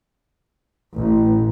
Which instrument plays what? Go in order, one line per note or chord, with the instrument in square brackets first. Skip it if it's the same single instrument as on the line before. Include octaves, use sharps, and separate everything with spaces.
[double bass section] A1 [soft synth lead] A2